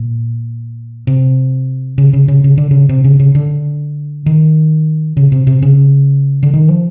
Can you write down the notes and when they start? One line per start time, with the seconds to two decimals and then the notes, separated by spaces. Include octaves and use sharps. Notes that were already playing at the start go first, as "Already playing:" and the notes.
Already playing: A#2
1.07 C3
1.98 C#3
2.13 C#3
2.28 C#3
2.44 C#3
2.58 D3
2.71 C#3
2.89 C3
3.04 C#3
3.20 C#3
3.35 D3
4.26 D#3
5.17 C#3
5.32 C3
5.47 C3
5.62 C#3
6.43 D3
6.53 D#3
6.68 F3